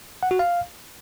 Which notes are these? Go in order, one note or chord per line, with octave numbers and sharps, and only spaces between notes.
F#5
F#4
F5